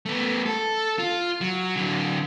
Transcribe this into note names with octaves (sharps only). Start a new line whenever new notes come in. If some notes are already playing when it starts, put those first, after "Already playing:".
A3 B3
A4
F4
F#3
D3 F#3